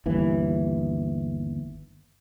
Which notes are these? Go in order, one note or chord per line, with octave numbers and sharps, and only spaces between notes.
G1 D#2 E3